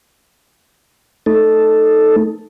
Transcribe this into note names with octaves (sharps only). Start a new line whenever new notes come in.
A3 D#4 A4